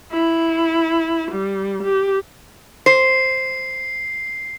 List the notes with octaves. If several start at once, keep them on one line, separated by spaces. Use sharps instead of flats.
E4
G3
G4
C5 C7